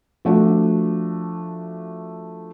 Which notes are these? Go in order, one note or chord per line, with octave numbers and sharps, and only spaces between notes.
F3 A3 D4 F#4